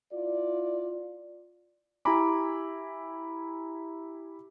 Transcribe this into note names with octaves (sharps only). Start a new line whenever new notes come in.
E4 F4 D5
E4 G4 G#5 A#5 B5 D6